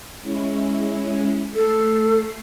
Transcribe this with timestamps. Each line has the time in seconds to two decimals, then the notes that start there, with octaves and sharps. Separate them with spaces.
0.22 G#3 C#4 E4
1.55 A3 A4 C7